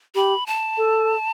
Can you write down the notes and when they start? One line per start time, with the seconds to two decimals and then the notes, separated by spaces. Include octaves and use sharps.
0.15 G4 B5
0.47 A5
0.78 A4